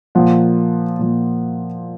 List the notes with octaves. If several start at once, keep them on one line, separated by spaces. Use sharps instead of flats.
A#2 F3 F#5
A#2 F3